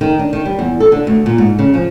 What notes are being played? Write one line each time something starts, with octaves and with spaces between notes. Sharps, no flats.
D#3
D4
D#3
G3
E2
A4
D3
D2
A#2
G#2
C#3
F3